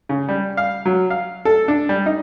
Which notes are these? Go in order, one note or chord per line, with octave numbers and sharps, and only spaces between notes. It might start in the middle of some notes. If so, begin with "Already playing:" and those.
C#3
G3
F5
F#3
F5
A4
D4
G3
D#4